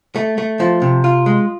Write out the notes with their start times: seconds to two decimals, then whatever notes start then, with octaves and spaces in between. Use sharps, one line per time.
0.16 A3
0.38 A3
0.60 F3
0.82 C3
1.04 F4
1.26 G#3